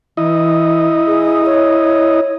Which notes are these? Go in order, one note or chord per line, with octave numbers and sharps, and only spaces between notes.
E3 E4 D#5
G#4
C#5